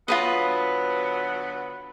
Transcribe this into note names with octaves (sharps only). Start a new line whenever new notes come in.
D3 F#3 B3 F4 B4 D#5